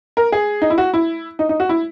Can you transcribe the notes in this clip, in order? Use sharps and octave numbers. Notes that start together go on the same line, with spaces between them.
A#4
G#4
D#4
E4
F#4
E4
D#4
D#4
F#4
E4